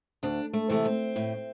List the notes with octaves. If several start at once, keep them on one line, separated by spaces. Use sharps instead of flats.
D2 D4
A3
C3 E3 A3
C4
A2